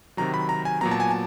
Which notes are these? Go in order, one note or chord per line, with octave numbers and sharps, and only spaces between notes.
C3 D#3 F#3 A#5
B5
A#5
G#5
A#2 F#3 B3 A#5
A5
G#5
A5